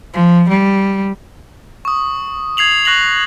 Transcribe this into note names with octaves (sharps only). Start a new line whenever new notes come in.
F3
G3
C#6 D#6
G#6 C7 F7 F#7
C#6 F#6 A#6 C7 F#7